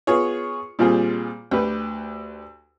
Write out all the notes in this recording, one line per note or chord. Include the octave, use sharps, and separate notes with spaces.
B3 F4 G#4 C#5
A#2 G3 C4 F4 G#4
D2 G4 B4